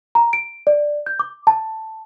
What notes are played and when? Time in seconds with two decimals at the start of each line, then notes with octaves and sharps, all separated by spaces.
0.15 A#5
0.33 D7
0.67 D5
1.06 G6
1.19 D6
1.47 A5